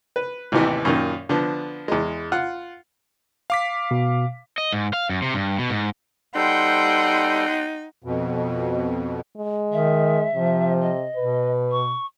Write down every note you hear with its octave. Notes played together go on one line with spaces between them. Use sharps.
B4
A1 D#2 C3 E3 G4
F#2 A#2 D#3
D3 F3 B3
E2 G#3
F4 F#5
F5 D6 B6
B2
D#5
G#2
F5
F#2
C3
G2
B2
G#2
G3 D#4 A4 C5 F#5 G5 C6
F2 B2
G#3
D#3 E5
C3 F3
D#5
B2 B4
C#6